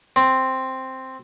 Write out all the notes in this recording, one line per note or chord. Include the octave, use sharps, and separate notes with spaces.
C4